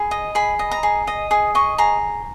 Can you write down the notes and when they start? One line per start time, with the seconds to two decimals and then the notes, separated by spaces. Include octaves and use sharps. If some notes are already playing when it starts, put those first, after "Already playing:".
Already playing: G#4 B5
0.11 D#5
0.35 G#4 B5
0.59 D#5
0.71 A#5
0.83 G#4
1.07 D#5
1.31 G#4 D#6
1.55 D#5 C#6
1.78 G#4 A#5